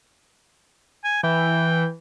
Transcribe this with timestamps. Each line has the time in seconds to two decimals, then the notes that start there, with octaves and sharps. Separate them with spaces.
1.04 G#5
1.23 E3 G5